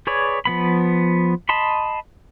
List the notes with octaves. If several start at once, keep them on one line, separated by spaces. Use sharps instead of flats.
G#4 B4 C#5 D5
F3 B3 B5
D#5 A5 B5 C6